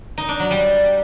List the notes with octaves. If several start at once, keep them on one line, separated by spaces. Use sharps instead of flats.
D#4
D4
F#3
G3